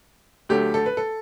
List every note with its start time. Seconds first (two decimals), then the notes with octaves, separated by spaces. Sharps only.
0.49 D2 D3 F#3 A3 G4
0.74 A4
0.86 B4
0.97 A4